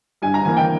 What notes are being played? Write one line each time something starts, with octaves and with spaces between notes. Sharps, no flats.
G2 G#5
A#5
E3 A#3 G#5
G5